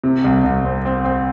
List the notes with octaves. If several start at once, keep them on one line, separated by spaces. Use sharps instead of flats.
C3
C2
C2
C4
C4
C4